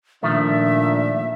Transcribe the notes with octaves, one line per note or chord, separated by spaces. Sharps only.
A#2 D#3 F3 A3 D4 E5